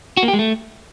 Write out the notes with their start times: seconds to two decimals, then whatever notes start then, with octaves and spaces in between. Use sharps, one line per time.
0.17 F#4
0.23 A#3
0.28 G4
0.33 G#3
0.39 A3